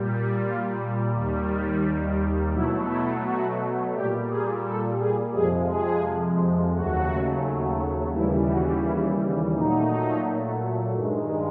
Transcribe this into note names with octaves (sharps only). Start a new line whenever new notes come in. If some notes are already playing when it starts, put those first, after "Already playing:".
Already playing: A#2 G3
F4
D#2 D#3 G3
B2 F#3 A3 E4
E4
F#4
A#2 G3 G4
G#4
A4
G#4
F2 C3 F3 G#3 G#4
G#4
D#2 C#3 F#3 A3 F#4
D#2 C#3 E3 G3 E4
F#4
E4
A#2 F#3 A3 D#4
G2 D#3 G#3